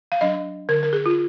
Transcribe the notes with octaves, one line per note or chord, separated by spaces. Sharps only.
F5
F#3 D4 D#5
D3 A#4
A#4
G#4
F4